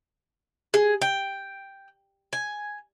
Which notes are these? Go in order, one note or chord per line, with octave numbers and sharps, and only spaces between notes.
G#4
G5
G#5